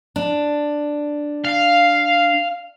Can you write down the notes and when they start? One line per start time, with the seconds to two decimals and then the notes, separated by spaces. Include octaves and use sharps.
0.16 D4
1.44 F5